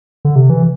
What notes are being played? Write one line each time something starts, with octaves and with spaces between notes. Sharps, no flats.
D3
C3
E3